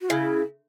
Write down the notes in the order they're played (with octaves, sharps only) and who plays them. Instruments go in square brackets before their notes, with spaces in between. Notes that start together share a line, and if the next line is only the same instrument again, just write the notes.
[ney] F#4
[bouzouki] C#3 [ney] E4